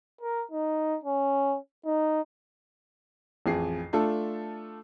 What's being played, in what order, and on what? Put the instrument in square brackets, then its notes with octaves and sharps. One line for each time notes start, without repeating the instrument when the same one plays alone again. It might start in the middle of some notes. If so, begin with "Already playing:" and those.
[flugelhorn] A#4
D#4
C#4
D#4
[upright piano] A1 F2 G#4 C7
A3 D4 F4 A4